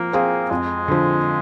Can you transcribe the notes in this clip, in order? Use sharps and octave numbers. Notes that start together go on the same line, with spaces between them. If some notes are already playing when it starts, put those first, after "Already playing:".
Already playing: F3 A#3 C4
C4 F4 G#4
F2 G#3
D3 F3